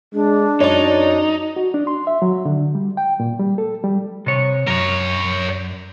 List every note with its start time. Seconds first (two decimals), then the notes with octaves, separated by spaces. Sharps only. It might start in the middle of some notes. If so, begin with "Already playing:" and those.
0.14 G#3 D4
0.61 F#2 D#4 C#5 D5
1.56 F#4
1.74 D4
1.87 C6
2.07 E5
2.22 F#3
2.45 D3
2.75 G3
2.97 G5
3.20 A#2
3.39 G3
3.58 A4
3.84 G3
4.26 C3 C#5
4.67 F#2 A#4 C#5